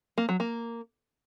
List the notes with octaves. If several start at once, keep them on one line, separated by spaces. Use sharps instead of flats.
A#3
F#3
A#3